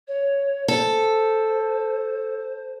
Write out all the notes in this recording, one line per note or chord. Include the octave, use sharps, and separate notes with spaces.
C#5
A4 C5